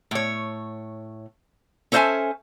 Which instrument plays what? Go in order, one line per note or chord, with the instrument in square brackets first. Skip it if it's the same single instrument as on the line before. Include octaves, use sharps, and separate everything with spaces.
[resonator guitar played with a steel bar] A2 C#5
C#4 A4 C5 D#5 E5 G#5